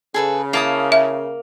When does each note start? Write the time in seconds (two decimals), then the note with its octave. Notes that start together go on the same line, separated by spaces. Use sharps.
0.14 C#3 G#4 A4 B4
0.53 A#3 E4 A5 D#6
0.92 E5